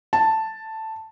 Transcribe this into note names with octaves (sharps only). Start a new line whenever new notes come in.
A5